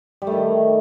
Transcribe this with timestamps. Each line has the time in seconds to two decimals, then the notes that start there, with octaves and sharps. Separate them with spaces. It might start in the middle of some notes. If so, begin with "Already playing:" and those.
0.22 G3
0.27 A3
0.32 D#3